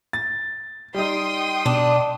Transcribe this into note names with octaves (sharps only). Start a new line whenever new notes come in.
A6
G3 D#4 G5 C6 D#6
B2 D4